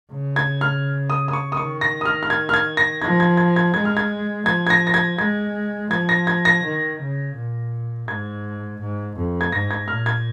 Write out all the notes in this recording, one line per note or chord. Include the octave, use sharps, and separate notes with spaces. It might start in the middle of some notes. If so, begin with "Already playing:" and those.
C#3
G#6
F6
D#6
D#6
C#6
D#6
D#3 C#6
A#6
D#6
F6
F6
G#6
F6
G#6
A#6
F3 G#6
G#6
G#6
G#6
G#3 G#6
F6
G#6
F3 G#6
G#6
A#6
A#6
G#6
G#3 G#6
F3 G#6
A#6
G#6
A#6
D#3
C#3
A#2
G#2 G#6
G#2
F2
G#6
G#2 A#6
G#6
A#2 F6
G#6